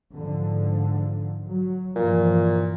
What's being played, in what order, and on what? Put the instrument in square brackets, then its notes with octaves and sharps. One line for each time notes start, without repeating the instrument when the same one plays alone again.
[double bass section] G#2 D3 F3
F#3
[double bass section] G2 E3 F3 [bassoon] A#2